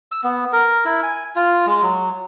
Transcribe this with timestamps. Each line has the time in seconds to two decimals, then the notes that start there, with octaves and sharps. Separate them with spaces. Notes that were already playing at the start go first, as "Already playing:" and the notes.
0.12 E6
0.24 B3
0.53 A#4
0.85 E4
1.03 G#5
1.36 F4
1.67 G#3
1.82 F#3